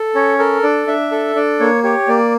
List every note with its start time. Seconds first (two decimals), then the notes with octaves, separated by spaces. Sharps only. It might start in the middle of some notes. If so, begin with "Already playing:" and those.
Already playing: A4
0.15 C#4 C#5
0.39 A4 A#4
0.63 D4 D5
0.87 D4 E5
1.12 A4
1.35 D4 D5
1.60 A#3 C#5
1.83 G4 C#5
2.08 A#3 D5